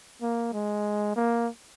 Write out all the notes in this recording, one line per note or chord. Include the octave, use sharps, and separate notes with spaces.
A#3
G#3
A#3